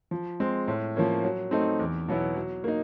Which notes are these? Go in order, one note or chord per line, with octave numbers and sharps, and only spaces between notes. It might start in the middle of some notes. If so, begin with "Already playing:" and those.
F3
G#3 C4
A2
F3 A#3 C#4
F#3
A3 C4 D#4
E2
B2 F#3 B3 E4
F#3
A#3 D#4